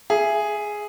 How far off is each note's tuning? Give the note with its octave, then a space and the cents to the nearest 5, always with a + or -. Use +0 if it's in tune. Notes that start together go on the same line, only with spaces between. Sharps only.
G#4 +0 E5 +25